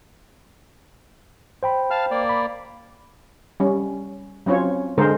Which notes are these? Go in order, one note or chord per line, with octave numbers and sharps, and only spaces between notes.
C5 G5 B5
F5 A5 F6
A#3 D5
B5
G3 C#4
F#3 C4 C#4 F4 C#5
D3 G#3 A#4 C5